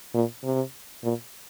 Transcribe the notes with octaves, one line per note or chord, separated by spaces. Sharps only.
A#2
C3
A#2